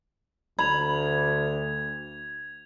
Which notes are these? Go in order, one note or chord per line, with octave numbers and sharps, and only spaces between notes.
D2 B5 G#6 F7